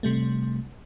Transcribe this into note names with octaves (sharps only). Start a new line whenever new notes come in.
C3 G3 A3